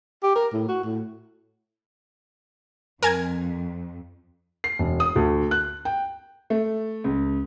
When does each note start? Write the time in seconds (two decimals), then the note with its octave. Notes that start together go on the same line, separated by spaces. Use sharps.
0.23 G4
0.35 A#4
0.53 A2
0.68 F#4
0.84 A2
3.03 F2 A#4 G#5 G#6
4.64 C7
4.79 E1
5.00 D#6
5.16 D2
5.51 F#6
5.85 G5
6.50 A3
7.04 C#2